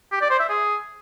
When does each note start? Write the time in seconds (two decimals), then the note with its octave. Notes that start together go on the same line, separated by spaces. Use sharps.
0.12 G4
0.21 D5
0.31 C5
0.40 E5
0.49 G#4